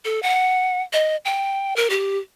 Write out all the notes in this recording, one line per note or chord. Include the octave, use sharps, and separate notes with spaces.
A4
F#5
D#5
G5
A#4
G4